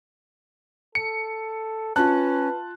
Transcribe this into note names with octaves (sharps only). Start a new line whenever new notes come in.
A4 C#7
C#4 F4 B4 A5 F#6